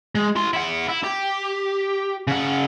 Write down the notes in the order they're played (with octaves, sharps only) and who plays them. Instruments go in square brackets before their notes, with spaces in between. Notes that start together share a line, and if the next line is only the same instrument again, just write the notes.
[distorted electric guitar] G#3
E4 C6
E4 F#5
E4
G4
C#3 F#5